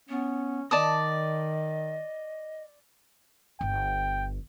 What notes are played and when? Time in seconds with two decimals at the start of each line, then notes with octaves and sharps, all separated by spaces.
0.09 B3 C#4
0.71 D#3 D5 D#5 A5 D#6
3.61 G1 G5